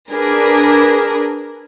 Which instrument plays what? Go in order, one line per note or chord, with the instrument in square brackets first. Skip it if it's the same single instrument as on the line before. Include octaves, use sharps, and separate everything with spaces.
[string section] D4 G#4 A#4 B4